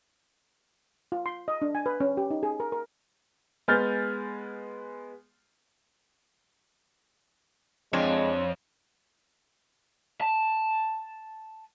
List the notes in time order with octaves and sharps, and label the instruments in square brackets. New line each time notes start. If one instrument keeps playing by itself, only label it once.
[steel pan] F4
C6
D#5
D4
G#5
B4
C#4
G4
D#4
G#4
A#4
A#4
[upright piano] G#3 B3 G#5 F6 G6 A6
[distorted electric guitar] F2 [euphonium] G#3 [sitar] C4 D4 F4 [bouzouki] C#5
[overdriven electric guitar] A5